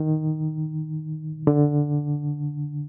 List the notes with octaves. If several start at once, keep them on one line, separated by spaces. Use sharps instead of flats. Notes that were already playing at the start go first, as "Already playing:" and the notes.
Already playing: D#3
D3